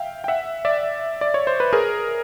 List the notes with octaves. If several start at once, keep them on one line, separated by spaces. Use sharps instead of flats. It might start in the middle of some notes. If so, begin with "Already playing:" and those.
Already playing: E5 F5 G5
G5
E5 F#5
D5 E5
D5
C#5
C5
B4
G#4 A#4